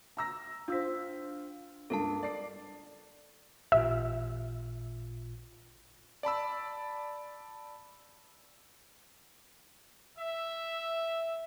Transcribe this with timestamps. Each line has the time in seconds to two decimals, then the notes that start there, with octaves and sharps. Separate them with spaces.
0.17 A#5 E6 A#6
0.68 D4 F4 C5 E6 B6
1.90 C#2 G2 A4 A#4 A5
2.23 D5 C7
3.72 A1 A#2 F4 E5
6.23 D5 A5 B5 E6
10.18 E5